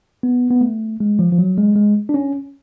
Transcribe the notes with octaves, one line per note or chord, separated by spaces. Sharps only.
B3
B3
A3
G#3
F3
F3
F#3
G#3
G#3
D4
C#4